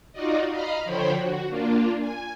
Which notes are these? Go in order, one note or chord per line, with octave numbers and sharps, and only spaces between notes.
D#4 F4 F#4 D5 D#5
D#5 F5 A#5 B5 F6
D3 F3 C5 C#5 G5 B5
F#4
A#3 D4 F4
G#5